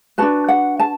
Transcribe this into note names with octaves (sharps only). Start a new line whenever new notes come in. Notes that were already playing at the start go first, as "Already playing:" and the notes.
D4 F#4 B4 A5
F#5
A5